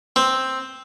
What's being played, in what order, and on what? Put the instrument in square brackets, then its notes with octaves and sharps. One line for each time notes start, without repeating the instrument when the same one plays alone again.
[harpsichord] C4